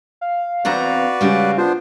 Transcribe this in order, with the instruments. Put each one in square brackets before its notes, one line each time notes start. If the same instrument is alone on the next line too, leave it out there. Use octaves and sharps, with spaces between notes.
[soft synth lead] F5
[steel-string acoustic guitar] E2 C4 A#5 [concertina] F#4 B4 D5
[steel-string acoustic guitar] C#3 G3 G#3 [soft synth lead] F5
[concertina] B3 D4 C5 [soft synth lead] F4